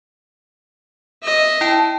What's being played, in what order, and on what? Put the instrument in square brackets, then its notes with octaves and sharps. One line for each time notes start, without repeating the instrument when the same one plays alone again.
[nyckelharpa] D#5 E5
[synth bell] E4 G5 A5